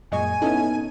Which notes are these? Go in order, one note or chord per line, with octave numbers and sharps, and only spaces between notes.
F#2 A#2 G#3 D#5 G#5 C#6
B3 C#4 D#4 E4 A4 D#5